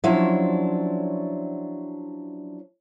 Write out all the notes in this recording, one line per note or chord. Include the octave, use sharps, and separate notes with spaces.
F3 F#3 C#4 D4 E4 E5